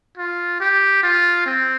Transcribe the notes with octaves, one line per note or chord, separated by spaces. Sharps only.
F4
G4
F4
C4